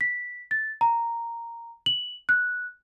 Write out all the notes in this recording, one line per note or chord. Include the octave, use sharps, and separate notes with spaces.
B6
A6
A#5
F#7
F#6